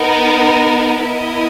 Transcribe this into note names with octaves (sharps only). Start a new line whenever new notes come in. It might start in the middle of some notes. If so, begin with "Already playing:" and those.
Already playing: B3 D#4 A#4
B3 E4 A#4 D#5